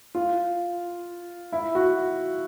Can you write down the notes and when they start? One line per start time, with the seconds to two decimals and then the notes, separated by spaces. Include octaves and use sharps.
0.15 F4
1.52 E4
1.75 F#4